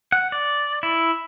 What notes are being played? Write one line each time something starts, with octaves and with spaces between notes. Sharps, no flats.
F#5
D5
E4